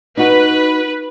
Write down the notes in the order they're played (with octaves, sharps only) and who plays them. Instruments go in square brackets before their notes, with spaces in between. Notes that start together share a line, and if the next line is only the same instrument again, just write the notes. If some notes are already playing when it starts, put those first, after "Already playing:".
[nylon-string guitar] D#4 F#4 [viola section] B4